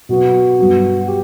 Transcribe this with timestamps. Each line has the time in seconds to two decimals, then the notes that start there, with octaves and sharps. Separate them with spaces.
0.09 B2 F#3 B3 F#4
0.59 G2 F#3 B3
1.08 G4